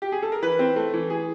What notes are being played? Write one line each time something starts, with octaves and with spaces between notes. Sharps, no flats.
G4
G#4
A4
A#4
E3 B4
C4
A3
E3
G#4